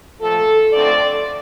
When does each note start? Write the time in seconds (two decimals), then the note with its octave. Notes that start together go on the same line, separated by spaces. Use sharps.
0.21 A#2 F3 A3 A4
0.72 F2 D3 F3 A3 C4 D5